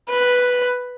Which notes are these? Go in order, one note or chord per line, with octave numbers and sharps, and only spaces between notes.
B4